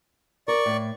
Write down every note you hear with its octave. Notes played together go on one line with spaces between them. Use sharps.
A#4 D5 C#6
A2